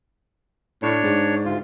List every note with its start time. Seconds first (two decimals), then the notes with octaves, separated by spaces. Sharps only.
0.83 A2 D4 C#5
1.04 G#2
1.45 D2 F4